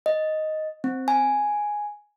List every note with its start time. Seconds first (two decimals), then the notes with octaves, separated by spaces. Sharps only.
0.06 D#5
0.84 C4
1.08 G#5